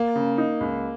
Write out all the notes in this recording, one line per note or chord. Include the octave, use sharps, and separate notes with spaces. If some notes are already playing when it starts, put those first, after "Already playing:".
Already playing: A#3
C#3
D#4
C#2